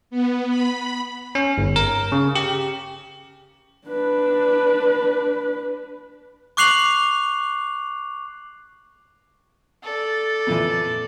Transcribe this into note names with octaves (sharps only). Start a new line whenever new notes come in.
B3
B5
C#4
G1
A#4
C#3
G4
D4 B4
C#6 D6 F#6 C7 F7 F#7
A4 D5
F2 A#2 E3